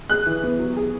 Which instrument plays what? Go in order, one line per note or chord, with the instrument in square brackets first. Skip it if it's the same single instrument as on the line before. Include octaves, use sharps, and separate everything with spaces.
[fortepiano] G#4 [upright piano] F#6
[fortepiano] E3
B3
F#3
G#4